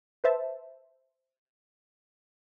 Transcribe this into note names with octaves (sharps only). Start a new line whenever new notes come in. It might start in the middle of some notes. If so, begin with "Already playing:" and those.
B4 C5 E5 A5